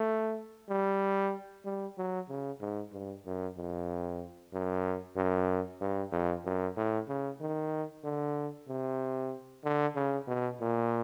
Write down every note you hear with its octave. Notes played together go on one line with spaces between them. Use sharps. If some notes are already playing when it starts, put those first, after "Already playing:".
Already playing: A3
G3
G3
F#3
C#3
G#2
G2
F#2
F2
F#2
F#2
G2
F2
F#2
A2
C#3
D#3
D3
C3
D3
C#3
B2
A#2